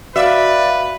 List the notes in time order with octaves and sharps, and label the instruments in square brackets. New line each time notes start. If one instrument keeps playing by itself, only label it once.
[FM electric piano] F#4 F5 [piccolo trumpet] B4 [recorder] D5 [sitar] E5